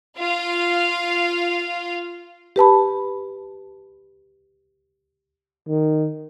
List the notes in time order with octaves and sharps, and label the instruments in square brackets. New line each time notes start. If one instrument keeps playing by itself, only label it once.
[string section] F4 F5
[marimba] G4 B4 A5 B5
[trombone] D#3